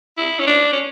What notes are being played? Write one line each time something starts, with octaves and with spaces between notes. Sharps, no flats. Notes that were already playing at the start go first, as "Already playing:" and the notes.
E4
C#4
D4
C#4